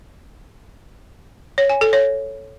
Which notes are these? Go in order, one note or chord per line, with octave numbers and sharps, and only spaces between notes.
C#5
G#5
A4
C#5